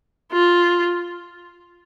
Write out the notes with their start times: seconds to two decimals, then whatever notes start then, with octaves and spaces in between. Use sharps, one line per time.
0.32 F4